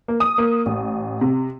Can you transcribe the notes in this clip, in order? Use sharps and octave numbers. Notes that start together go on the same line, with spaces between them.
A#3
D#6
A#3
A1
C3